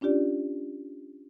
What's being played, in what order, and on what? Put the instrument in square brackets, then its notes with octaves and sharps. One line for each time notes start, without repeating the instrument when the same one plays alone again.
[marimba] C#4 D4 F4 G4 D5